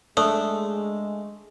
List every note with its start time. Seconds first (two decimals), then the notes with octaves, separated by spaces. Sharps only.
0.17 G#3 A3 D4 D#6